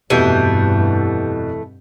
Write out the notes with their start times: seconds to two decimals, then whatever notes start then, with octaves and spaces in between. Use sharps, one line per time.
0.10 F1 G2 B2 E3 A3 G4 G6 D#7